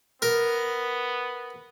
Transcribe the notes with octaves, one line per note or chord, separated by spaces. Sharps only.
B3 A#4